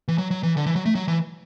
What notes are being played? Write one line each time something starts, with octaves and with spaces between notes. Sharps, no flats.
E3
F#3
F#3
E3
D3
E3
F#3
A3
F#3
E3